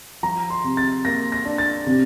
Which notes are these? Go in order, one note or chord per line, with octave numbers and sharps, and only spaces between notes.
F3 A#5
C6
C3
A6
A#3 A#6
A#6
D4
A6
C3